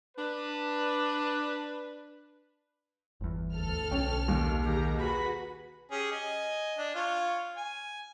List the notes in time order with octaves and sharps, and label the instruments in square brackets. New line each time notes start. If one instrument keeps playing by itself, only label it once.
[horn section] D4 B4
[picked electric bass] G1 E2
[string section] D2 A4 F6
[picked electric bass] B1 [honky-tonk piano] C#4 G5
[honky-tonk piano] D#2
[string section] D#3 G#3 A#5 [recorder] G4
[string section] F#4 G#4 B4 [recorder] B5
[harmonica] C#4 G4 G#4
D#5 G#5
D4
F4 C#5
G#5